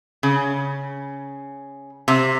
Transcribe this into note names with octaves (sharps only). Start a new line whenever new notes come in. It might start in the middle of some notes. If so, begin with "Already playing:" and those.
C#3
C3